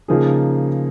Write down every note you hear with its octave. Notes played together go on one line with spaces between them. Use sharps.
C#3 F3 A#3 D#4 G#4